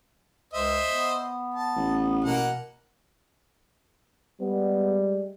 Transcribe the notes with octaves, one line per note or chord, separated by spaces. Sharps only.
C#2 C5 D#5 E5
B3
A5
A1
B2 A#3 F#5
G3 G#3 B3